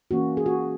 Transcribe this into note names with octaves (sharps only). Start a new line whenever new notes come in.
E3 A#3 C#4 F#4
G#4
F#4